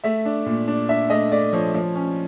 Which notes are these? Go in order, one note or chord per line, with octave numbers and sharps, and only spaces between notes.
A3 E5
D4
A#2
D4
D4 E5
A3 D#5
A3 D5
F3 C#5
F3
C#4